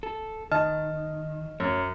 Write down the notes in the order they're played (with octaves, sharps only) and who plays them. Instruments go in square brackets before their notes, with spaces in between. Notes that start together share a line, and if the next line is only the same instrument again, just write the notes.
[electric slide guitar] A4
[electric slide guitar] D#3 [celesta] D#5 F6 [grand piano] A5
[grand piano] F#2 [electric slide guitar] C#5